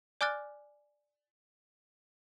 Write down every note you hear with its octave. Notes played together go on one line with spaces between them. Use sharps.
D5 G#5 D6 F6 F#6 A6